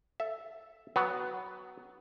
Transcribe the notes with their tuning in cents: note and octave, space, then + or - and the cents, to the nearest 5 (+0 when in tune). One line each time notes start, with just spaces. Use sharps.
A4 +0 E5 +0
F#3 +10 B3 +0